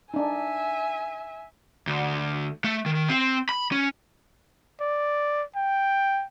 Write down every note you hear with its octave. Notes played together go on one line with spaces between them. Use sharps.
D4 D#4 E5 G#5
D2
A3
D#3
C4
B5
C#4
D5
G5